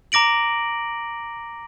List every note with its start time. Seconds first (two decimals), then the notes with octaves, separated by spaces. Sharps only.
0.12 A#5 D6 A#6 D7 F#7